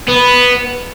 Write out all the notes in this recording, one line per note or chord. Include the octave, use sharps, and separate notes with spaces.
B3